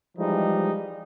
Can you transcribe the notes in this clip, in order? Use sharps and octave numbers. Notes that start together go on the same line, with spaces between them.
E3 F3 G3 G#3 D#4